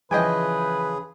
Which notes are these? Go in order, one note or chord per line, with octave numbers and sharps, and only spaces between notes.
C#3 E3 F3 G#4 B4 D#5 G5 G#5